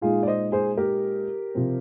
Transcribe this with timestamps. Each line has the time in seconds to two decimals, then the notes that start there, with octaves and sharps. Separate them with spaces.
0.02 A#2 G#3 D#4 F4 G#4
0.23 D5
0.27 C5 D#5
0.52 G#4 C5
0.77 G4 A#4
1.55 C3 F3 C4